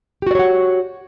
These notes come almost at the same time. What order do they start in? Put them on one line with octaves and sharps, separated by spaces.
G4 F#4 D5 C#5 F#5